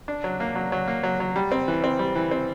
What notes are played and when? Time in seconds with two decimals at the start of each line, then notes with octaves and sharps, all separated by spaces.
0.08 D4
0.24 F#3
0.40 A#3
0.55 F#3
0.72 F#3
0.88 A#3
1.03 F#3
1.20 F#3
1.36 G3
1.52 C4
1.68 E3
1.84 C4
1.99 G3
2.16 E3
2.31 C4